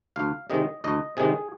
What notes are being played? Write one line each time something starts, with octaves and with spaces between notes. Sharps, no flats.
D2 F5
C3 D#3 G#3 D#5
D2 D#5
C3 D#3 G#3 G#4